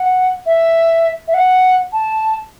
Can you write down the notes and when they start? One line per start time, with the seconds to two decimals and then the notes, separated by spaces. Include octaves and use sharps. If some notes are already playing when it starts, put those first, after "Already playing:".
Already playing: F#5
0.46 E5
1.28 E5
1.34 F#5
1.93 A5